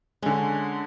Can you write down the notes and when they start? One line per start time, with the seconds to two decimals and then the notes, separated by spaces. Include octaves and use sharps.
0.22 D3 G#3 C#4